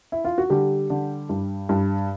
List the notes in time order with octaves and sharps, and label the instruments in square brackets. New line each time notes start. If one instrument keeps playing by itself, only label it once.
[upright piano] E4
F4
F#4
D3 G3 G4
D3
G2
G2